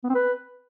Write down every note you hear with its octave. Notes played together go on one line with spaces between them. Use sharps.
B3
C4
B4